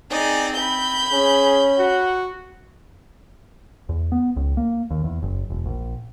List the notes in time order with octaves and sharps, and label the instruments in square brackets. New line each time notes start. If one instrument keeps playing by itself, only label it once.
[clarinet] C4 [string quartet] D#4 G#4 D5
[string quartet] B5 G6
[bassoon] C#4 [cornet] G#4
[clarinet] F#4 [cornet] F#5
[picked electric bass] E2
B3
C#2
A#3
D#2
E2
F#1
E1
A#1